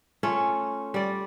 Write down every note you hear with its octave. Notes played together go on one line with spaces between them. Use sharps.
A3 C#4 F4
G3 D5